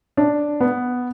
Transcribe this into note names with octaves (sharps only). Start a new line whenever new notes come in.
D4
B3